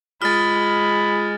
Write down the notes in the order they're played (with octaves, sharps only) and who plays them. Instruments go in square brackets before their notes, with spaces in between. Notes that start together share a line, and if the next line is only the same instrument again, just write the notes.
[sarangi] G#3 [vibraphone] F4 D#6 [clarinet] B5 [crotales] F6 A6